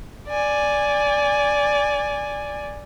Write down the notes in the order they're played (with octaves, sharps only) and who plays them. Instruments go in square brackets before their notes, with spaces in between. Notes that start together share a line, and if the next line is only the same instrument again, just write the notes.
[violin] D5 G#5